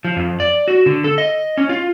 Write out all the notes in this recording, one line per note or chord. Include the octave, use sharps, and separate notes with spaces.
F3
F2
D5
F#4
D3
A4
D#5
C#4
F4